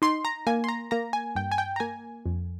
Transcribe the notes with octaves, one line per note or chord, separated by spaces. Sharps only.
D#4 C6
A#5
A#3 G#5
C6
A#5
A#3 A#5
G#5
G2 G5
G#5
G5
A#5
A#3 G#5
F2